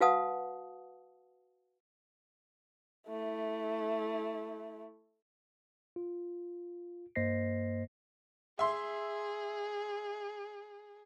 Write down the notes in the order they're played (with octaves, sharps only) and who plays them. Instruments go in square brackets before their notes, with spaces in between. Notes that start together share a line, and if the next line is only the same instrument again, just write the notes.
[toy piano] F#4 B4 F5 F#5 A5 D#6
[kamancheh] A3 E4
[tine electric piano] F4
G2 A#3 C5 D#5 A#6 C7
[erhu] G#4 [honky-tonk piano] E5 C6